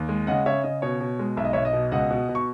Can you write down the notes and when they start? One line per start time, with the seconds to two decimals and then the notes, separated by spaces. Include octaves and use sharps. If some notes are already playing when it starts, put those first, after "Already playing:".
Already playing: D#2
0.09 G#3
0.27 C#3 D#5 F#5
0.46 C#3 C#5 E5
0.64 C#3 D#5
0.82 B2 C#5
1.00 B2
1.19 G#3
1.37 B1 E5
1.45 D#5
1.53 B1 C#5 E5
1.65 D#5
1.73 B2
1.92 C#2 D#5 F#5
2.11 B2
2.29 B2
2.35 C#6